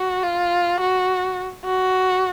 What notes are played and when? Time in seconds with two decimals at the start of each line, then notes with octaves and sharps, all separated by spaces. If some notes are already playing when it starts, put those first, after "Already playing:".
Already playing: F#4
0.23 F4
0.80 F#4
1.65 F#4